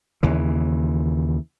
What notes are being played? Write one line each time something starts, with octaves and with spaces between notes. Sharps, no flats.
D#2 C#3 E3